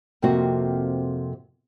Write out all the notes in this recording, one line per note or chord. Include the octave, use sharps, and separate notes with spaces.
F2 C3 A#3 F#4